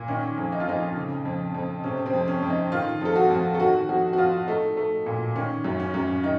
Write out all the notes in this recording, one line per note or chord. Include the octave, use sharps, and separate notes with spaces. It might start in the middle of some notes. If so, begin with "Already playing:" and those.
Already playing: A#2
D#3 C#4
F2
D#4
F4
F2 D#4
C#3
F2
F2
C3 C#4
C4
F2
C#4
F2
D#4
D#3 F4
F2 A4
F#4
F2
A4
D#3 F#4
F2 F#4
F#4
F2 F4
A3 D#4
A3
A#2
D#3 C#4
F#2
C#4
F#2
D#3 D#4